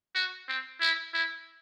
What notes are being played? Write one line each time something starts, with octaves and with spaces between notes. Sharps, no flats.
F#4
C4
E4
E4